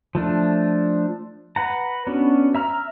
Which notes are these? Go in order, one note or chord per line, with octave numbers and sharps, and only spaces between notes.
F3 A3 D4
B4 F#5 A#5
B3 C#4 D4 F#4
E5 A#5 F6